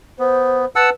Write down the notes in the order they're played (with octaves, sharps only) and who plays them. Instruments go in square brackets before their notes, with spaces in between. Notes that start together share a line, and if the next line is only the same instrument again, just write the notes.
[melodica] B3 [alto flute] C5
[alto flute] B4 [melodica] F#5 A5 E6